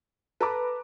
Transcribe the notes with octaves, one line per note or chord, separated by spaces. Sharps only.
A4 B4 A#5 D6